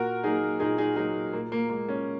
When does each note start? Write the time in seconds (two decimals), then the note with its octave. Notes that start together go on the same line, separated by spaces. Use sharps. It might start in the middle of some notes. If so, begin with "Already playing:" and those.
Already playing: A#2 F#4 A#4
0.24 F#3 A#3 D#4 G#4
0.60 A#2 D#4 G#4
0.78 D#4 G#4
0.96 F#3 A#3 D#4 G#4
1.33 A#2 A#3
1.52 A#3
1.70 G#3 A#3
1.88 C#4